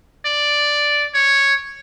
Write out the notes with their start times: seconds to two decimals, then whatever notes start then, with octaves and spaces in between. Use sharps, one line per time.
0.25 D5
1.14 C#5